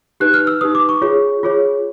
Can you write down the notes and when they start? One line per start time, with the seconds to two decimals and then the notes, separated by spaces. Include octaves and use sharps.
0.20 D#4 G4 B4 F#6
0.34 F6
0.47 E6
0.61 D#4 G4 B4 D#6
0.75 D6
0.89 C#6
1.02 F4 G#4 C#5
1.43 F4 G#4 C#5